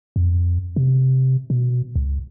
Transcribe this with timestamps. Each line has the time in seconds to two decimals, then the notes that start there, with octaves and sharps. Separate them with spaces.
0.16 F2
0.76 C3
1.50 B2
1.96 C#2